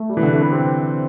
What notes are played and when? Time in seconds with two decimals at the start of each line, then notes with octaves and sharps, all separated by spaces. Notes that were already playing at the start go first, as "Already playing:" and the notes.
Already playing: A3
0.09 G3
0.17 E3
0.23 D3
0.31 C3 A3
0.43 B3
0.52 C3 C4